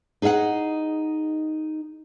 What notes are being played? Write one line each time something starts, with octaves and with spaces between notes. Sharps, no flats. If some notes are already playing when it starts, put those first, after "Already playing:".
D#4 G#4 D#5 E5 F#5